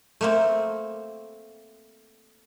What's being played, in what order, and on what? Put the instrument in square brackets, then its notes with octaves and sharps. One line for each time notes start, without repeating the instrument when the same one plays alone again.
[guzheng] A3 A#3 C4